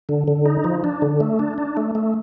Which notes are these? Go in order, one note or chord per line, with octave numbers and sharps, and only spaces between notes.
D3
D3
D#4
F3
D4
D3
A3
D4
D4
A3
A3